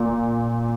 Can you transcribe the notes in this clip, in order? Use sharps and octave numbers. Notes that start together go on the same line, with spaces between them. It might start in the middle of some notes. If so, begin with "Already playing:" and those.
Already playing: A#2 A#3